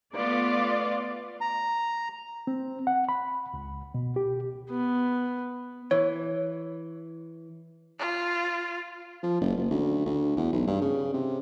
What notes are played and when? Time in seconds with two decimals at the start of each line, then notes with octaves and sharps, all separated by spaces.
0.14 A3 B3 F4 D5
1.41 A#5
2.47 C4
2.87 F#5
3.09 B5
3.54 C#2
3.94 B2
4.16 G4
4.70 B3
5.91 E3 C#5
7.99 F4
9.23 F3
9.41 F#1
9.57 F#1
9.71 D2
10.06 D2
10.37 E2
10.53 B1
10.68 G2
10.82 C#3
11.13 C3